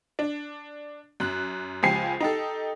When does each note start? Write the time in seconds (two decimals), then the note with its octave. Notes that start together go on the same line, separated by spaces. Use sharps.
0.19 D4
1.20 F#2 F#6
1.83 C#2 F3 G4 G#5 C7
2.20 D#4 G4 A4